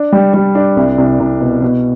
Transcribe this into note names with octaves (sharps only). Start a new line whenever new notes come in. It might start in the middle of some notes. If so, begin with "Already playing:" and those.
Already playing: D4
G3
G3
D4
C2
C2
C2
B2
B2